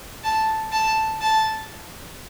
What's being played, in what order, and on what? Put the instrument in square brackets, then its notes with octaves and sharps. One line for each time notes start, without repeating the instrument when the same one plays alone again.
[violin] A5
A5
A5